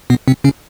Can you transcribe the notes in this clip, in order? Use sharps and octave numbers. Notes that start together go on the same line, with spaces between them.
B2 B3
C3 C4
C#3 C#4